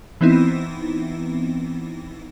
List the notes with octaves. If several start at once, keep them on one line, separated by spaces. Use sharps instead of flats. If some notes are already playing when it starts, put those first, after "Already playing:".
E3 B3 C4 D#4 E4